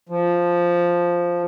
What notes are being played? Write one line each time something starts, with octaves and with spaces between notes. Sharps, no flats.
F3